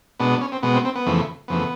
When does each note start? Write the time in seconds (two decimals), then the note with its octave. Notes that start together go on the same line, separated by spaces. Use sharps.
0.19 B2 G#3 B3 D4
0.31 D4
0.41 C#4
0.52 C4
0.63 B2 G#3 B3
0.74 C4
0.85 C4
0.95 B3
1.06 F2 C#3 E3 A3
1.48 F2 C#3 E3 A3 B3